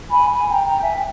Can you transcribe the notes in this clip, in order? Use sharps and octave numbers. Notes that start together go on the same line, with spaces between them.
G#5 B5
G#5 B5
G5 A#5
G5 A#5
E5 G#5
G5